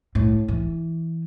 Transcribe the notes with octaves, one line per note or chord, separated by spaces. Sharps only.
A2
E3